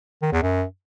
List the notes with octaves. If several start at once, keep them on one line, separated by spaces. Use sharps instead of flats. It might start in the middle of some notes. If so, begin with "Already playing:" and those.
D#3
E2
F#2